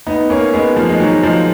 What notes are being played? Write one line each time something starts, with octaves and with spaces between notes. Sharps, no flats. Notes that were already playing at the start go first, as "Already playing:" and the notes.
B3 D#4
A#3 C#4
G#3 B3
F3
G#3
D#3 F#3
F3 G#3